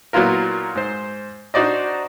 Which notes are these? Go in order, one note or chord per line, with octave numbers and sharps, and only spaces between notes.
A#2 F#3 B3 E4 F4 A#4
G#2 C5
D4 D#4 F#4 C5 D5 D#5